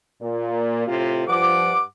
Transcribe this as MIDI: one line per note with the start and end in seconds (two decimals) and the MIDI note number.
0.21 0.84 46
0.87 1.25 45
0.87 1.25 48
0.87 1.25 65
1.29 1.83 43
1.29 1.70 53
1.29 1.83 78
1.29 1.83 86